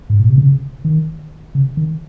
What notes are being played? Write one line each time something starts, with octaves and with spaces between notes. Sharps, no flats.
G#2
A#2
C3
C#3
D#3
C#3
D#3